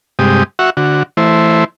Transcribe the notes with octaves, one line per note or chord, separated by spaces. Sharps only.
G2 C3 G#3 G4 D#6
F#4 E5 F#5 C#6
D3 F#4
E3 A3 E4 C5